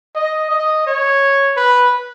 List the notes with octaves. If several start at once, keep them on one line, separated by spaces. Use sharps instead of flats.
D#5
D#5
C#5
B4